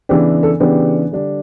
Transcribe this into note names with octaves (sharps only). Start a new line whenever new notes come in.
C#3 E3 B3 D4 G4
A4
C#3 E3 B3 D4 G4
D3 G3 D4